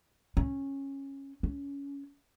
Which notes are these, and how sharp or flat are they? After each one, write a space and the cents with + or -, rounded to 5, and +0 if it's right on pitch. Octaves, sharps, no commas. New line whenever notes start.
C#4 -15
C#4 +20